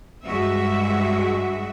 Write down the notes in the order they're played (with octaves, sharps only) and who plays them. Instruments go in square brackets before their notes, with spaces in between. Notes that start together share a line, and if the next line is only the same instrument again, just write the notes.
[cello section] G2 G#3 F#4 E5